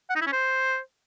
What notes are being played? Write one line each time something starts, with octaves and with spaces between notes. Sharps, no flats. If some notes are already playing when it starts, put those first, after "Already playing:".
F#5
D#4
E4
C#4
C5